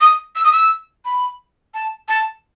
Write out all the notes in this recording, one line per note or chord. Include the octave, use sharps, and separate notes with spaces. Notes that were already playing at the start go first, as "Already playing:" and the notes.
D#6
E6
D#6
E6
B5
A5
A5